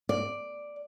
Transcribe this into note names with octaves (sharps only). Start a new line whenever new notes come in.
D5